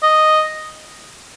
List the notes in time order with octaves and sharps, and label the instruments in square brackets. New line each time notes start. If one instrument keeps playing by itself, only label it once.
[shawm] D#5